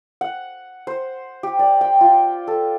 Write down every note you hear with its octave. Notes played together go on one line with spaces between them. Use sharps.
F#5
C5
G4
D5
G5
F4
A4